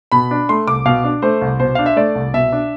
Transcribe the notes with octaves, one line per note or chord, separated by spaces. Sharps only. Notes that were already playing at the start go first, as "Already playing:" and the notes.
B2 B5
D4
A3 C6
C2 D6
B2 F5
D4
A3 C5
C2
B2 C5
D4 F5
E5
A3 D5
C2
B2 E5
D4